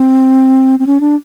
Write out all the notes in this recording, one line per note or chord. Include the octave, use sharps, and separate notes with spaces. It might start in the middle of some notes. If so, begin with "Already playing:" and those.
Already playing: C4
C4
C#4
D4